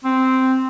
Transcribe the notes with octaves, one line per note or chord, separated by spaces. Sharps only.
C4